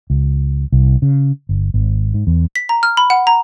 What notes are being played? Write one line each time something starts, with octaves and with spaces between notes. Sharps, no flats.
C#2
C2
C#3
G1
G#1
G#2
E2
B6
A#5
F6
B5
F#5
A#5